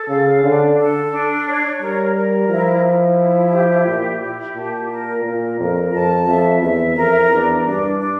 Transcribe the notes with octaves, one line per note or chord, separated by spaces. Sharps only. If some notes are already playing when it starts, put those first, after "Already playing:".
Already playing: A4
C#3 F5
D3 D4
A4
D4
C#5
G3 A#4
A#4
F3 E4
E4
E4
G4
A#2 E4
G4
A#2 A5
A#4
A#2 A#4
F2 A#4
F2 A5
F2 E5
E2 E5
F2 A#4
E2 D4
G2 D4
D4